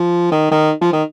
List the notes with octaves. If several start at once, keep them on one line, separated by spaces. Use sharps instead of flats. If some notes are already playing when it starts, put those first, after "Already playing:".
Already playing: F3
D#3
D#3
F3
D#3